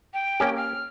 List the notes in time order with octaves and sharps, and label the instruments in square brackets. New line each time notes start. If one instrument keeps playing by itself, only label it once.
[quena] G5
[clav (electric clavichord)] A#3 C#4 G4
[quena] F6